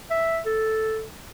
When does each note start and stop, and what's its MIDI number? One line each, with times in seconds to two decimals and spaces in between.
0.10 0.39 76
0.46 1.04 69